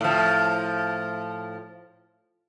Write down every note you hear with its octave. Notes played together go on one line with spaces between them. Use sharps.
A2 F3